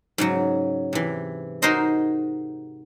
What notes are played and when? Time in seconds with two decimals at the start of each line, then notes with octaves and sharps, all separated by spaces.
0.18 G#2 C#3 F#3
0.93 C3 E3
1.62 D#4 F#4 G#4 A#4 C5 D#5